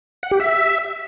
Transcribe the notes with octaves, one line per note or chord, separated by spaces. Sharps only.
F#5
G4
E5